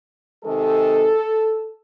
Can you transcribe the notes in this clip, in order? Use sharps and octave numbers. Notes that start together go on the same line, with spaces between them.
C3 D#3 G#3 A4